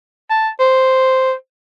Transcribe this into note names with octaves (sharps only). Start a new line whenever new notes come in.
A5
C5